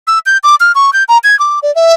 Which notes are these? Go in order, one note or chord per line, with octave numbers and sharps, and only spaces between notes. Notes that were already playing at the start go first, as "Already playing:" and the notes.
E6
G6
D6
F6
C#6
G6
A#5
G#6
D6
D5
E5